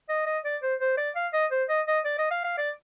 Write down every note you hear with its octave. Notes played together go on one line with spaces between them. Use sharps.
D#5
D#5
D5
C5
C5
D5
F5
D#5
C5
D#5
D#5
D5
D#5
F5
F5
D5